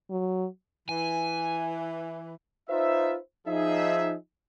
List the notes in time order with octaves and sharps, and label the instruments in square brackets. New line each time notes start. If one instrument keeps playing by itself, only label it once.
[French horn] F#3
[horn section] E3 [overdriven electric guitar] G#5
[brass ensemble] D#4 F4 B4 C5 E5
F3 D#4 G#4 E5